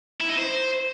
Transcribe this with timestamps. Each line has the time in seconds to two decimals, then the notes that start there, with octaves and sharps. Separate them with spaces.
0.20 E4
0.29 D#4
0.38 C5